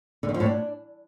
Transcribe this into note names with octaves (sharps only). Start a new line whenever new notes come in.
D3
D#3
F3
A2
D4